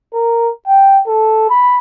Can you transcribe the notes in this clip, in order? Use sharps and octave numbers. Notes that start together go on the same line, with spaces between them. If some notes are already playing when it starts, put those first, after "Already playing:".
A#4
G5
A4
B5